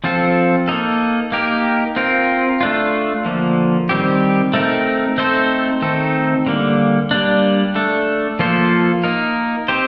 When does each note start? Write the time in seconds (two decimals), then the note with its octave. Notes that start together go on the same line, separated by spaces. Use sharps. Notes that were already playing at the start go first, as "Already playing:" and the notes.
0.04 F3 C4 F4 A4
0.68 A#3 D#4 A4
1.32 A#3 D#4 G4 A#4
1.96 C4 F4 A#4
2.61 A3 D4 F4
3.25 D3 F3 A#3
3.89 D#3 G3 C4 G4
4.54 A3 C4 D#4 A#4
5.18 A3 C4 D#4 A4 C5
5.82 D#3 A3 C4 D#4 A4
6.47 D3 G3 A#3
7.11 G3 A#3 D4
7.75 A3 D4 A4
8.39 F3 A#3 F4 A4 C5
9.04 A#3 D#4 A#4
9.68 C4 G4 C5